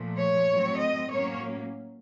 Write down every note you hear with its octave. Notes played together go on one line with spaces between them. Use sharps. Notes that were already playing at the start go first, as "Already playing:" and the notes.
Already playing: A#2 F3 A3
C#5
A2 F#3 A3 C4
D#5
A2 F#3 A#3 C#4 C#5